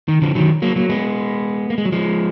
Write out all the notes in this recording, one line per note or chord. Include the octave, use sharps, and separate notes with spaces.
D#3
D3 F3
D#3 F#3
F#3 A#3
F#3 A#3
G#3 B3
A#3
G#3
F#3
F3 G#3